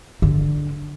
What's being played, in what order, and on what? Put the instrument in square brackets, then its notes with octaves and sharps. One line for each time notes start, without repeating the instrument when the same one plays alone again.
[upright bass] D3